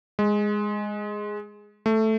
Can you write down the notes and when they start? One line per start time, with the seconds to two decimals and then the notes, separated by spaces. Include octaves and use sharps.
0.19 G#3
1.86 A3